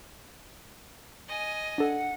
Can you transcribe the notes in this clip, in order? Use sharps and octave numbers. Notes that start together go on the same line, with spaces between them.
D#5 G#5
D4 A4 F#5